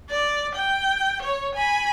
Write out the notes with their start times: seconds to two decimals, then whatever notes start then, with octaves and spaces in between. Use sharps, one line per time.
0.11 D5
0.56 G5
1.22 C#5
1.55 G#5 B5